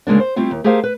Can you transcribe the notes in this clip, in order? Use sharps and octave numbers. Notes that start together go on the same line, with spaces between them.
D2 C#3 G#3 A#3 D4
C5
G3 A3 C4 E4 F4
D#2
A3 G4 G#4 A#4 C5 F5
B4